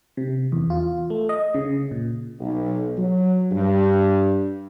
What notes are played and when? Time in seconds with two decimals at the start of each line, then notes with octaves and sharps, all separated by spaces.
0.17 C3
0.52 E2
0.70 F4
1.10 A3
1.29 D#5
1.54 C#3
1.91 A#2
2.40 B1
2.97 F#3
3.52 G2